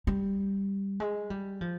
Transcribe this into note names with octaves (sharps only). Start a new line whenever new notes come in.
G3
G#3
G3
F3